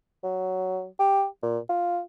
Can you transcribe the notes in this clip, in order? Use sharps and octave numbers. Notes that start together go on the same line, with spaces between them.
F#3
G4
A#2
F4